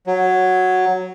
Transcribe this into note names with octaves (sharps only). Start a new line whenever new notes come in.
F#3